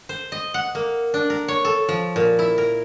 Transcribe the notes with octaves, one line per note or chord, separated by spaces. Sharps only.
C5
D#5
F#5
A#3
D4
A#4
C#5
A4
F3
A#2
E4
A#4